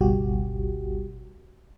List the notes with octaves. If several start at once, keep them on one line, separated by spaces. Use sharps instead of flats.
G1 C#2 B2 G3 F#4 G4